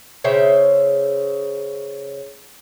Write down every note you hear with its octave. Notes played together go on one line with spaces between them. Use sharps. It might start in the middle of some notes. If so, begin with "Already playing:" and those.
C#3 C5 E5 G5